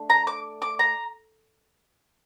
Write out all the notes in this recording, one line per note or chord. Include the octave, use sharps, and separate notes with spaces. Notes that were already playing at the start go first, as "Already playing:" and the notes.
Already playing: A3 D4
A#5
D6
D6
A#5